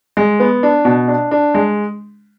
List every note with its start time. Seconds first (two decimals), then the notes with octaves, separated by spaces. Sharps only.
0.17 G#3
0.40 B3
0.63 D4
0.85 B2
1.08 D4
1.31 D4
1.55 G#3